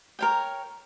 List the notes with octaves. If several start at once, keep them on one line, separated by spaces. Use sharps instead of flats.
A#4 C#5 G5